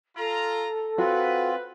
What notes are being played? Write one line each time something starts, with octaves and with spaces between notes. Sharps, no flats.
F4 A4 A#5
C4 F4 F#4 B4